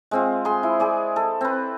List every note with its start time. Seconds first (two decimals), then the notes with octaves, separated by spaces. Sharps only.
0.11 G#3 C4 F4
0.45 G#4 C6
0.63 E4
0.80 G#4 D5
1.16 A4
1.41 C4 B4